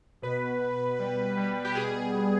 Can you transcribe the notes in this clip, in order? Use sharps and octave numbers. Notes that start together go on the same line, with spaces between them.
B2 B4
B2
G3
G3
G4
B2 G#4
B2